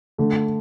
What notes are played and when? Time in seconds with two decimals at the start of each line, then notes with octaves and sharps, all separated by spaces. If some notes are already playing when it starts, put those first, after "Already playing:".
0.18 D3 A3